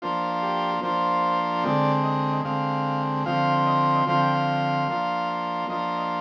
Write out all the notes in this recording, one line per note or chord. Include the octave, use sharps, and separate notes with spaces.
F3 A#3 D4 F4 C5
G4
F3 A#3 D4 F4 C5
D3 G#3 C4 D5
D#5
D3 G#3 C4 F5
D3 F3 C4 F4 F5
D#5
D3 F3 C4 F4 F5
G5
F5
F3 A#3 D4 F4
F3 A#3 D4 F4 D#5